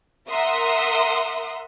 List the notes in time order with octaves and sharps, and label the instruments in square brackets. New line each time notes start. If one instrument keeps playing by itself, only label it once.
[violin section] A#4 E5 F#5 C6 D#6